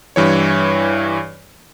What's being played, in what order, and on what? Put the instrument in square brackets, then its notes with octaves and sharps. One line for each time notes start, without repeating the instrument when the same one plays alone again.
[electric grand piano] G2 E3 C#5